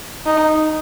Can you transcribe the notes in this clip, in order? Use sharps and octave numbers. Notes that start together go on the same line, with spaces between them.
D#4